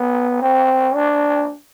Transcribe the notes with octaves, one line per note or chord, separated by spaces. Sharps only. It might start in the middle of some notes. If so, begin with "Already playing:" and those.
Already playing: B3
C4
D4